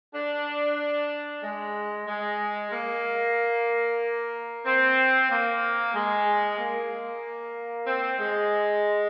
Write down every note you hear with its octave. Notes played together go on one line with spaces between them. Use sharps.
D4
G#3
G#3
A#3
C4
A#3
G#3
A#3
C4
G#3